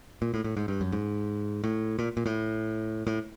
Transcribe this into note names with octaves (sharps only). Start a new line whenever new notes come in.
A#2
A2
A2
G#2
G2
F#2
G#2
A2
A#2
A#2
A2
A2